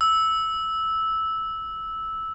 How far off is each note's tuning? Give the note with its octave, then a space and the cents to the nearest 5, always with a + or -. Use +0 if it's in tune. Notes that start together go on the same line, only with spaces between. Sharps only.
E6 -10